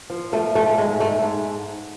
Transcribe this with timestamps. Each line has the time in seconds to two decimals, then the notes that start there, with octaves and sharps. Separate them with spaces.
0.10 F3
0.33 F3 A3
0.55 G#2 A3
0.78 G#2 G#3
1.00 G#2 A3
1.23 G#2